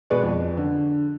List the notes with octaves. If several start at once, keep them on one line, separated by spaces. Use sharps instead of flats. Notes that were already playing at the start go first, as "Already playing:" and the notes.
B2 G#3 G#4 B4 D5 C#6
F2
D3